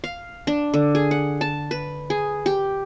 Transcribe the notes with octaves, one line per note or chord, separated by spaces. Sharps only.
F5
D4
D3
G#4
F#5
A5
B4
G#4
G4